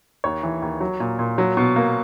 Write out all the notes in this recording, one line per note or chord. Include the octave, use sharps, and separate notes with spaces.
D#2 C#5
E3
D#2
F#3
A#2
A#2
F#3
B2
A#3